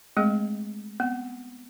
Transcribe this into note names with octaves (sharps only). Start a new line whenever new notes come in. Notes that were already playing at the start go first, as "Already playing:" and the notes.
G#3 A3 C4 G#4 D#5
B3 C4